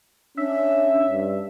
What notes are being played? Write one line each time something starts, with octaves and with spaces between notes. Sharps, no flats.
C#4 D4 E5
G2